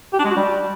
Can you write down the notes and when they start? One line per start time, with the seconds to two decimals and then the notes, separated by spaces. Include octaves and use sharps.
0.13 G4
0.19 D4
0.25 G#3
0.31 F#4
0.37 G3